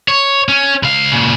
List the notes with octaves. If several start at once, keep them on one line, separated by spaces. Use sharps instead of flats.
C#5
C#4
C#2 F5
A#2 C#3